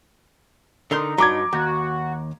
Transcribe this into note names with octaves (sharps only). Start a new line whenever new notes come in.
D3 D#4 A#4 C6
G2 F#3 A#5 D6 G#6
D#2 F#4